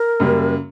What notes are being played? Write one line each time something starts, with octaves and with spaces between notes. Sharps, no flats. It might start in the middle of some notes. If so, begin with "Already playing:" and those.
Already playing: A#4
F#2 C#3 G3 A#3